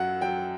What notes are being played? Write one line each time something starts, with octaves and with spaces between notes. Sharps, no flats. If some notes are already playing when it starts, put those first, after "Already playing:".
Already playing: F#2 F#3 F#5
F#3 G5